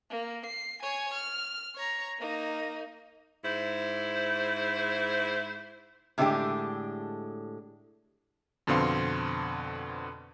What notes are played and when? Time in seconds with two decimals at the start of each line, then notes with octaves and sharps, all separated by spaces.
0.10 A#3
0.46 C7
0.83 C#5 G#5
1.14 F6
1.75 C#5 A#5
2.19 A#3 D#4
3.44 G#2 E4 C5
6.18 A2 D3 G#3 C#4 D4 G4
8.67 F2 B2 D3 C4 F5 C6